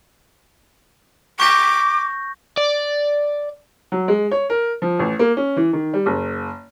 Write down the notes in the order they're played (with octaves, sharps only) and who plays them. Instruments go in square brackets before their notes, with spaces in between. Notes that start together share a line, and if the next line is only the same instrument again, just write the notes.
[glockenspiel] C#6 G6 A#6 [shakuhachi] D6
[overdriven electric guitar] D5
[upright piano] F#3
G#3
C#5
A#4
F3
A1
A#3
C#4
E3
D#3
G3
F#1